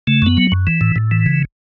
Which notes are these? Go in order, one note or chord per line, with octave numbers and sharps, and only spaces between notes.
C#3 A3
F#2 B3
F#3
F#2
E3
A2
A2
E3
C#3